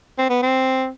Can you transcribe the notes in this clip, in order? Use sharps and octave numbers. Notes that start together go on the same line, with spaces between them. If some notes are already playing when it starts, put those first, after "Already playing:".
C4
B3
C4